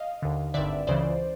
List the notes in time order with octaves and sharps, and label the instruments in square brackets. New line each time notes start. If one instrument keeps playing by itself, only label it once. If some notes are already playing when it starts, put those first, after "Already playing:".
Already playing: [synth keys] D#5 F5
D#2 D3
G#1 G2 D3 D5 E5
C#2 C#3 E3 C5 D5